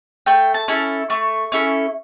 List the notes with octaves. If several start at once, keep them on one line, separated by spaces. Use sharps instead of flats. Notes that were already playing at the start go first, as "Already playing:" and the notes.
A3 G5
A5
C#4 E4 A4
A3 C#6
C#4 E4 A4